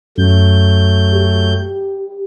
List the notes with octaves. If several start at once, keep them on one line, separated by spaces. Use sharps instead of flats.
F#2 F#3 A3 G6
G4